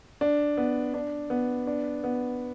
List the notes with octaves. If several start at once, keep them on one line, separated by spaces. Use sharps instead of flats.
D4
B3
D4
B3
D4
B3